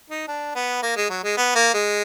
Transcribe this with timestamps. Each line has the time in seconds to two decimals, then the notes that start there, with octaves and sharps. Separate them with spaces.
0.10 D#4
0.28 D4
0.55 B3
0.83 A#3
0.96 G#3
1.10 F#3
1.23 G#3
1.37 B3
1.55 A#3
1.74 G#3